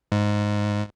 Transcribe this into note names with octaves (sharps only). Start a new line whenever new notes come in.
G#2